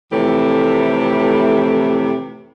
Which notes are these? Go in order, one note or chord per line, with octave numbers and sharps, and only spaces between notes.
F2 A2 C3 E3 A3 G4